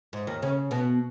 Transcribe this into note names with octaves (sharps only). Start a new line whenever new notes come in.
G#2
D#2 D#3
C#3 C#4
B2 B3